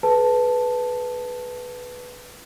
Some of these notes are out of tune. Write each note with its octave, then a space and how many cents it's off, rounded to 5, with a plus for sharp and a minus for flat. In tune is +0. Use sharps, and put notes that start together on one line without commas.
G#4 +45 B4 +0 A5 +0